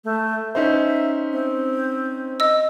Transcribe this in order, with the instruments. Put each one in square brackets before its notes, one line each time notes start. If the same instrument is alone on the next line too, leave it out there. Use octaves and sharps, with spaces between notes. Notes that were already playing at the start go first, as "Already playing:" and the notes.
[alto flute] A3
[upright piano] C#4 D#4 C5 [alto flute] E5
[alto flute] C4
[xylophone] D#5 E6